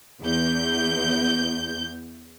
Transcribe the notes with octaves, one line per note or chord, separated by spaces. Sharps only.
E2 G6